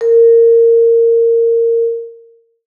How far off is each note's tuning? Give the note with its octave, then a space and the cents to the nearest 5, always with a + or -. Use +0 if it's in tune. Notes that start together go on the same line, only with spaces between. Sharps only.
A#4 -20